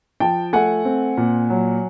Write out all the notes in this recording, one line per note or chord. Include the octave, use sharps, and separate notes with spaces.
F3 G5 A5
A3 F#5 G#5
C4
A#2
F#3